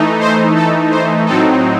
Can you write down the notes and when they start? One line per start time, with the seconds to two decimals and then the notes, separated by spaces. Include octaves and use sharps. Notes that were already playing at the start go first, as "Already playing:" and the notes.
Already playing: E3 A3 D#4
0.20 C5
0.55 A4
0.91 C5
1.26 A2 F#3 C4 D#4 A4